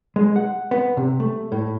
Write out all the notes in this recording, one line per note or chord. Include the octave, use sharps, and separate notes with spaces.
G#3
F#5
B3
C3
A3
A2